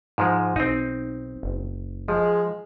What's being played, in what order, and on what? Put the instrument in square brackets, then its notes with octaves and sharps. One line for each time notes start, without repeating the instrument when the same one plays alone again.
[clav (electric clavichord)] G#2 F3 G#3
[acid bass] B1 [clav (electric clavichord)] C4 D#4
[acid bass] F#1
[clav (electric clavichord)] F3 [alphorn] G#3